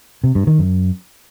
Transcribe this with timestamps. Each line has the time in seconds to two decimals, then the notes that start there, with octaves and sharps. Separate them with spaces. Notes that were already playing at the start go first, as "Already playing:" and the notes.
0.24 C3
0.35 G2
0.47 D#3
0.59 F#2